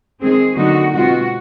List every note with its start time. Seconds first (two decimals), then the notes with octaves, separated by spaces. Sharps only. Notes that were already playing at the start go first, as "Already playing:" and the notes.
0.21 D#3 G#3 C4 G#4
0.57 D3 F#3 A#3 D#4 F#4
0.93 B2 G#3 C4 F4 F#4